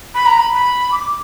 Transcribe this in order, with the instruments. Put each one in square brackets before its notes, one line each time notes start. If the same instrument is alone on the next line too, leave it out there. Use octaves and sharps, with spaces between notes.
[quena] B5
A#5
B5
B5
D6